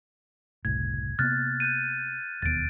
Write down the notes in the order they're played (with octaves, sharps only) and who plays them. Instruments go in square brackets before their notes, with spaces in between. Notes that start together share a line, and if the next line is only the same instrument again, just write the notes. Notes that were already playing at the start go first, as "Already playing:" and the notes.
[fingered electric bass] F#1 C2 A2 [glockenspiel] G#6
[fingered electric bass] C3 A#3 B3 [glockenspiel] F6 F#6 A6
[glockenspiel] F#6 G6 D#7
[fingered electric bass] E1 D#2 B3 [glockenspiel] A6 D7